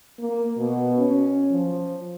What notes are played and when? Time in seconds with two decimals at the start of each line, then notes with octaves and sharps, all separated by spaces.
0.19 A#3
0.57 B2
0.98 C#4
1.51 F3